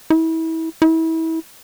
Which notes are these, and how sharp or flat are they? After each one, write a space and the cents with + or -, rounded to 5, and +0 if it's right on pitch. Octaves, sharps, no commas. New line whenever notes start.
E4 -30
E4 -30